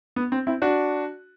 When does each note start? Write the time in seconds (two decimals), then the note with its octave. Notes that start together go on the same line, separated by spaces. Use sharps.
0.16 B3
0.32 C4
0.47 C4 E4
0.62 D4 F#4